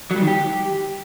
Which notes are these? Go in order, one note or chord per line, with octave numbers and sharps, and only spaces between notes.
F#3
G3
D#3
G4